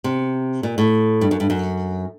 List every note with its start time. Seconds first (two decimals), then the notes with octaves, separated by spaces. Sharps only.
0.04 C3
0.63 A#2
0.78 A2
1.21 G2
1.31 F#2
1.40 G2
1.50 F#2